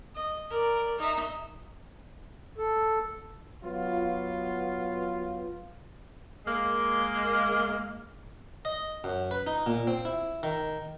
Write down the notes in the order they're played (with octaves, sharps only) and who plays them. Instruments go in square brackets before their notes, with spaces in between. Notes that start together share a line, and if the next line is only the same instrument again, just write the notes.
[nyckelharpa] D#5
A#4 D5
D#4 E5
[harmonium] A4
[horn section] F#3 B3 F4
[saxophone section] G#3 A#3
[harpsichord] D#5
F#2
B4
D#4
A#2
C4
E4
D#3